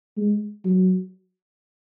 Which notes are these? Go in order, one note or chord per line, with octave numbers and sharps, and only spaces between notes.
G#3
F#3